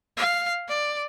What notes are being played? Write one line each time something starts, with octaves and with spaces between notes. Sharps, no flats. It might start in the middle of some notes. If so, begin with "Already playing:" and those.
F5
D5